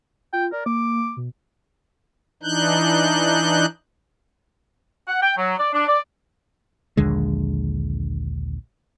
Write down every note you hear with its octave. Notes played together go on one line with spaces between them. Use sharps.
F4 G5
A#4 D5
A#3 D6
B2
E3 D4 D#4 F#6 G6
F#5
G5
F#3
D5
D4
D5
A#1 D#2 D3 G#3